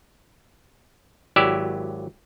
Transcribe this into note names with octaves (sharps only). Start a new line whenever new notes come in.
G#1 F#3 E4 G4 D5 E5